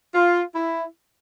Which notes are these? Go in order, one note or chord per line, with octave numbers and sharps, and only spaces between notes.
F4
E4